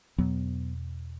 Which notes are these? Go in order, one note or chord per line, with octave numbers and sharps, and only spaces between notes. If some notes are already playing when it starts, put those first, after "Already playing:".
E2 B2 F#3 B3